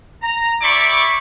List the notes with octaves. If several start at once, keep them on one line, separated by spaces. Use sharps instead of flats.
A#5
E4 G4 D5 B5 C#6 D6